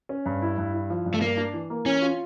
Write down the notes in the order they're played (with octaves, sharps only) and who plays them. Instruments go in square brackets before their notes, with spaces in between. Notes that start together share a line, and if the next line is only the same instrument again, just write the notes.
[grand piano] C#4
G2
E4
G2
E4
F3
G2
[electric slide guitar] A3
[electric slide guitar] A#3 [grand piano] D4
[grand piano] D4
E3
A#3
[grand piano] E3 [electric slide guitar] C#4
[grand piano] F4